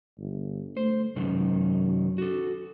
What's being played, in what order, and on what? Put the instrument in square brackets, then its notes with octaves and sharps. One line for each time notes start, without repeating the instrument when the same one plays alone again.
[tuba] G1
[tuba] A3 [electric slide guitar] C5
[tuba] F#2 [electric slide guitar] C3 D#3 F#3
[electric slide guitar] F#4 A4